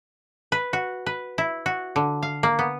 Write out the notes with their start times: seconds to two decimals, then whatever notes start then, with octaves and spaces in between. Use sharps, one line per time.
0.52 B4
0.73 F#4
1.06 B4
1.38 E4
1.66 F#4
1.96 D3
2.22 F5
2.43 A#3
2.59 B3